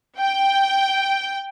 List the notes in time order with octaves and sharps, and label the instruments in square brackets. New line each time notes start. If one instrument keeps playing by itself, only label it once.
[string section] G5